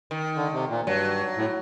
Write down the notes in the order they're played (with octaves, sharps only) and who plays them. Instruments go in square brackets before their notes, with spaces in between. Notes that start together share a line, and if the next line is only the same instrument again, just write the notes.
[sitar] D#3
[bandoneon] D3
C3
A#2
[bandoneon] G2 [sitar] F#3
[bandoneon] A2